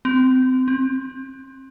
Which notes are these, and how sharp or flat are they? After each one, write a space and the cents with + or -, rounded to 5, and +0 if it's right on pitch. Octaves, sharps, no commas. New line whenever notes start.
C4 -25
C4 +25